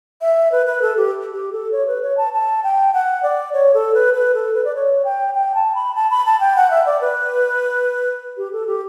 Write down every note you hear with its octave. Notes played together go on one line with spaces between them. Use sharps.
E5
B4
B4
A4
G4
G4
A4
C#5
B4
C#5
A5
A5
G5
F#5
D5
C#5
A4
B4
B4
A4
B4
D5
C#5
G5
G5
A5
B5
A5
B5
A5
G5
F#5
E5
D5
B4
G4
A4
G4